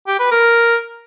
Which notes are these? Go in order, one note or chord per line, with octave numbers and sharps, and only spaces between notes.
G4
B4
A#4